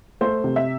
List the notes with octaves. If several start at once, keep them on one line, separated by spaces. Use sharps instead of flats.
A3 C5
C3
E5